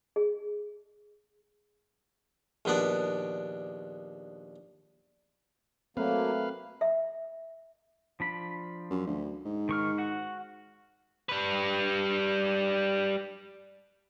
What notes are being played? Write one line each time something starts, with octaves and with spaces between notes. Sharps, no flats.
G#4
A#1 D#2 B3 D4 D5
F#3 A3 A#3 C4 B4 F5
E5
F3 D4 B5
F#2
D2
G#2
D#3 C#6 F6
F#4 F#5
G3 B4